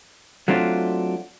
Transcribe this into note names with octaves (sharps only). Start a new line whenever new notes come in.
F#3 A3 C4 D4 F4